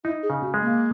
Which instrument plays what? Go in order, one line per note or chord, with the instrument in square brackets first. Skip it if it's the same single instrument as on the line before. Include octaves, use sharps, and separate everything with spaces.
[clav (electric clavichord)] D#4 [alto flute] E4
[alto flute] G#4
[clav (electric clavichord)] C#3
[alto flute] F#4
[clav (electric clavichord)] G#3
[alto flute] A#3